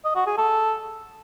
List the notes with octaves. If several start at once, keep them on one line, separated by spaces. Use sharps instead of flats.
D#5
F#4
G#4
A4